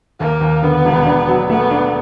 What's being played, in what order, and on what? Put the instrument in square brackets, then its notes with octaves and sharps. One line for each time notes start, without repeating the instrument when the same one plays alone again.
[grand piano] D#2 [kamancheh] A#3
[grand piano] D#2
[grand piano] D3 [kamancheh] B3
[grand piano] E1
D4
F#3
[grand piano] A3 [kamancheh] B3
[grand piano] D4